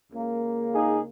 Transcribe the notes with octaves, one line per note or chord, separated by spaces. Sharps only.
C#2 C#3 A#3
D#4 G#4